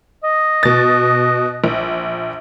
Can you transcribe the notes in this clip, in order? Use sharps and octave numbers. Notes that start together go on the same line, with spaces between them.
D#5
B2 A6
A#1